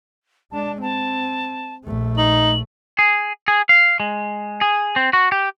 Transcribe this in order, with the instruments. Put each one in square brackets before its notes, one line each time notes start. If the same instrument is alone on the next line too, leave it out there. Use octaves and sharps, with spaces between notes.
[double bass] G#3 D4 [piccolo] A5
[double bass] C4 [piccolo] A5
[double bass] A#1 A3
[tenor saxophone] D#4 [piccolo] F#7
[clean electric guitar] G#4
G#4
F5
G#3
G#4
C4
F#4
G4